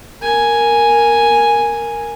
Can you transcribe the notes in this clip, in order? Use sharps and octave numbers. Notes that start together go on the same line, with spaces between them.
A#4 G#5